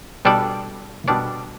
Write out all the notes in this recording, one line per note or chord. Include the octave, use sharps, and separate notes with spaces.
B2 G3 D4 A4 D5
B2 G3 D4 A4 D5